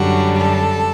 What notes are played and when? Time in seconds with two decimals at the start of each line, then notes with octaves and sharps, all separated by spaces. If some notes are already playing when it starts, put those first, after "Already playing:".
Already playing: F#2 D3 G3 D4 F#4
0.37 A4